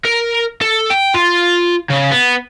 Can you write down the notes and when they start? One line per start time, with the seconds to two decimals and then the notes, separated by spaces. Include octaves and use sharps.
0.05 A#4
0.61 A4
0.90 G5
1.15 F4
1.90 C#3
2.12 B3